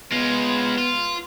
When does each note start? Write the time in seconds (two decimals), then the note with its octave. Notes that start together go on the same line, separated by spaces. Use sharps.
0.12 G#3 B3 F4
0.78 F4